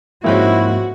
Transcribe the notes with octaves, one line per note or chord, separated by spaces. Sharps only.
G#2 F3 G#3 A#3 C4 C#4 E4 F#4